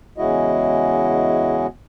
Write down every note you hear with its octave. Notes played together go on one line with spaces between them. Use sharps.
E2 C#3 G#3 E4 F#4 D#5